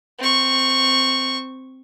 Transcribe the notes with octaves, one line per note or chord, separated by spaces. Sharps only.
C4 C#6